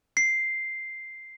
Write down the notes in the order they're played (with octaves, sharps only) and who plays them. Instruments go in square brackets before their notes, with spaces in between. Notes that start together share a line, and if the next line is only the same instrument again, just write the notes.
[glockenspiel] C7